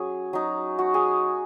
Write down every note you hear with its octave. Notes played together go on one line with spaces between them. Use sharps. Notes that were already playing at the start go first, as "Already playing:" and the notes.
Already playing: F#3 C#4 G#4 C#5
F#3 D#4
F#4
G#4